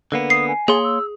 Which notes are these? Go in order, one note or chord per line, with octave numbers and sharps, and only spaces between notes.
D3 A#3 B3
D#6 C7
G#5
A#3 G#4 C#5 C6
E6